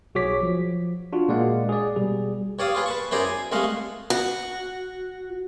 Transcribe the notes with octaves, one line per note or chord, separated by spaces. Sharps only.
B1 F#4 G#4 C#5 D6 B6
F3
D4 F4 F#4
A#2 G#3 A#3 D5 F5 F#5
G#4 D5
B2 G3 G#4
G2 C#5 D5 F5 D#6
F4 G#4 B4
B4 A5 C#6
F#2 E4 G#4 C5 D5 A#5
G#5
C2 G#3 A3 D#5 F5 F#5
F#4